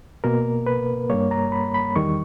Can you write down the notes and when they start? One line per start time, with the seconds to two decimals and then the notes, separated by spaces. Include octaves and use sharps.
0.24 B2 A#3 A#4
0.66 B4
1.10 G2 G3 A#3 C#5
1.31 A#5
1.52 B5
1.74 B5
1.96 E2 D#3 G3 C#6